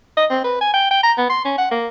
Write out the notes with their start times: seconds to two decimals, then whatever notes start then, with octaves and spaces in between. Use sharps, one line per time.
0.17 D#5
0.31 C4
0.44 B4
0.61 G#5
0.74 G5
0.91 G5
1.03 A#5
1.18 B3
1.30 C6
1.45 C#4
1.58 F#5
1.72 A#3